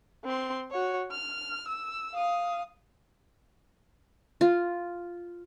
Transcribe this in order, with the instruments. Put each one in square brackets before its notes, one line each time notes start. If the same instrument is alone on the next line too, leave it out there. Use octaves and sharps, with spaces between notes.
[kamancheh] C4 C6
F#4 C#5
F6
E6
F5 D#6
[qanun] F4